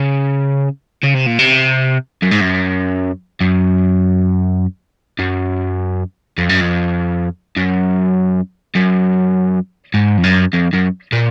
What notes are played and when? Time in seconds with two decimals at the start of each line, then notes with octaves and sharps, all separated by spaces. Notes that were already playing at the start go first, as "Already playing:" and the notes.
Already playing: C#3
1.04 C#3
1.15 C3
1.27 A#2
1.39 C3
2.22 F#2
2.31 G#2
2.41 F#2
3.41 F#2
5.19 F#2
6.38 F2
6.49 F#2
6.61 F2
7.56 F#2
8.75 F#2
9.94 G#2
10.18 F2
10.23 F#2
10.53 F2
10.73 F#2
11.12 A#2